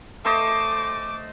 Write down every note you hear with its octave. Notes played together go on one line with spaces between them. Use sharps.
A3 C5 D#5 D6